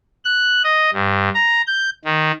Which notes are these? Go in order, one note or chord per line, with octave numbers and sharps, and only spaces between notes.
F#6
D#5
G2
A#5
G6
D#3